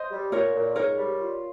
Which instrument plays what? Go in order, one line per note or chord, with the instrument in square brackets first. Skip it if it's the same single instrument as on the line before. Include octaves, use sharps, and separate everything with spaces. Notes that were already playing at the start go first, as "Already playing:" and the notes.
Already playing: [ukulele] C5 D#5
[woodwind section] G3
[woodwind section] A#2 [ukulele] A#4 C#5
[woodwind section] A#2
[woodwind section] G#2 [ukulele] A#4 C#5
[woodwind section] G3
F4